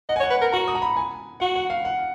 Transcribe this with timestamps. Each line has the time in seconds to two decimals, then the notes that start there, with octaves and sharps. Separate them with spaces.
0.09 D#5 F#5
0.16 G#5
0.20 C#5
0.23 F#5
0.30 B4
0.41 A#4
0.52 F#4 A#5
0.68 D#6
0.75 A#5
0.82 B5
0.97 G#5
1.40 F#4 F#5
1.56 F#5
1.70 F5
1.85 F#5